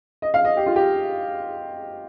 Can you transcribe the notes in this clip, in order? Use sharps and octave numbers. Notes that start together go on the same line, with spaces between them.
D#5
F5
D#5
G4
F4
G4